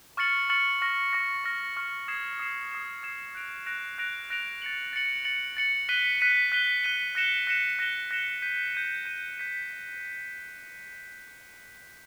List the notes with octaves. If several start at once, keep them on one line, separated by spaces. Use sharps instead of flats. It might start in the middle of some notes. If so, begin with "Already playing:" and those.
C#6 F6 A6 C#7 F#7
C#6 F6 A6 C#7 F#7
C#6 F6 A#6
C#6 F6 A#6
C#6 F6 A#6
C#6 F6 A#6
D#6 G#6 C7 E7
D#6 G#6 C7 E7
D#6 G#6 C7 E7
D#6 G#6 C7 E7
F#6 A#6 D7 F7
F#6 A#6 D7 F7
F#6 A#6 D7 F7
F#6 A#6 D7 F7
A6 C#7 F#7
A6 C#7 F#7
A6 C#7 F#7
A6 C#7 F#7
F#6 B6 D#7 G7
F#6 B6 D#7 G7
F#6 B6 D#7 G7
F#6 B6 D#7 G7
F#6 A#6 C#7 E7 G7
F#6 A#6 C#7 E7 G7
F#6 A#6 C#7 E7 G7
F#6 A#6 C#7 E7 G7
G6 B6 D#7
G6 B6 D#7
G6 B6 D#7
G6 B6 D#7